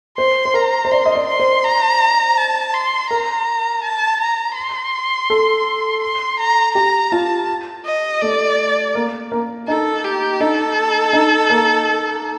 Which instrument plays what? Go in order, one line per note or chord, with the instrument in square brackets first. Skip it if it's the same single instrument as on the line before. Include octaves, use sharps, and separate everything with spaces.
[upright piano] C5 [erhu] C6
[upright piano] C5
[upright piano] A#4 [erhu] A#5
[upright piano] C5
[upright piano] D5 [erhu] C6
[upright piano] D#5
D5
[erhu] C6
[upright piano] C5
[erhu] A#5
A5
C6
[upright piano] A#4 [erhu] A#5
[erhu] A5
A#5
C6
[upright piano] A4
[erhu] C6
A#5
[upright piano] G4 [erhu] A#5
[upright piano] F4 [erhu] A5
[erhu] D#5
[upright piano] A3 [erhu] D5
[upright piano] A#3
A#3
[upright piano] D#4 [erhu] A4
[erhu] G4
[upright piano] D#4 [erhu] A4
[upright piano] D#4
A#3